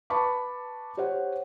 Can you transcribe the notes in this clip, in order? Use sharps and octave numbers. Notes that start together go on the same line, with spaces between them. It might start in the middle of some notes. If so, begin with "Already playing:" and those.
B4 A5 B5 C#6 D6
G4 C5 C#5 F#5